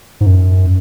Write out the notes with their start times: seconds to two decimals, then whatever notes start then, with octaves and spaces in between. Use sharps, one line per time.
0.21 G#2
0.26 F#2